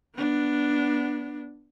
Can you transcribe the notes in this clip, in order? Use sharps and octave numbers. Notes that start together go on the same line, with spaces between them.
B3 D4